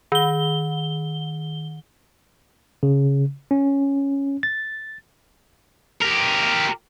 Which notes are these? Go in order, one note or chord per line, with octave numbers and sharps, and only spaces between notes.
D#3 G7
C#3
C#4
A6
G4 A#4